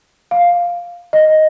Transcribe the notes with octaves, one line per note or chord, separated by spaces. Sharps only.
F5
D#5